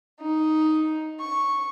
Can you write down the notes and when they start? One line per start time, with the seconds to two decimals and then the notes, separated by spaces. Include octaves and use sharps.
0.21 D#4
1.20 C#6